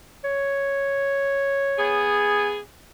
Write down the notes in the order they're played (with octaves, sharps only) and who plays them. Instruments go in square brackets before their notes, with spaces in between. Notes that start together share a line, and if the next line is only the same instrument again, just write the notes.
[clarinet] C#5
[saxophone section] B3 G#4